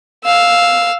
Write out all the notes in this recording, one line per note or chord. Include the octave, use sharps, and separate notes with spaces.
F5 E6